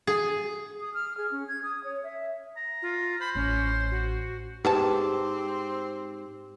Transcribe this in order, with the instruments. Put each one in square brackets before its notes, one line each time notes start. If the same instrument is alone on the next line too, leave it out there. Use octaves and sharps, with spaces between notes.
[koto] G#4
[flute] D#6
F6
G#4
C#4
G#6
D#6
C#5
E5
[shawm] A#5
[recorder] F4
[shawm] C5 [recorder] B5
[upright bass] A1 [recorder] C#4
[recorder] F#4
[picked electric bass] G#2 [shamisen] B3 G#4 A5 [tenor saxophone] C4 [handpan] G4